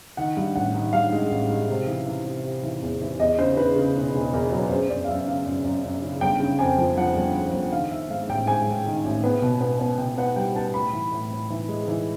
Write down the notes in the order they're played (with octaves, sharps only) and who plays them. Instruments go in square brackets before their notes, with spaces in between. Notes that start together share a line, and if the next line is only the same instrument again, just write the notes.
[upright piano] D#3 F#5
G2
A1 F#5
D#3
G2 F5
G#3
A1
G#3
C3
E3
E3
C3
C3
E3
E2
E3
E2 D#5
C#3 C5
C#3 B4
C#3
E1
E1
E2 A#4
F#3
F#2 C5
F#2 D5
F5
F#2 E5
C#3 F5
F#2
F#2
F#2
C#3
G1 G5
C#3
F2 G#5
F3
F3 F#5
G1
F3
G1
D#3 F5
D#3 E5
G#2 F5
A1 G5
G#2 G#5
G#2
D#3
A1
B3
B2
B3
B3
B2 G5
B3 F#5
G3 G5
B3 A5
A2 B5
E3
A2
A2
E3
G#3
E3